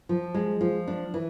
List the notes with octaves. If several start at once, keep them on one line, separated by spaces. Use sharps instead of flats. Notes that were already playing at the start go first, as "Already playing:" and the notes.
F3
G#3
F3
D4
E3